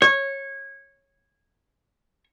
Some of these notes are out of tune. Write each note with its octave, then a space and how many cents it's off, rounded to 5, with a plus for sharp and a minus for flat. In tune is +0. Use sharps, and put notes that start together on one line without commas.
C#5 -15